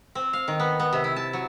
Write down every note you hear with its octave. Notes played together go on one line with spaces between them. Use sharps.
C4
F5
D#3
B3
B3
C3
E4
A5
F#3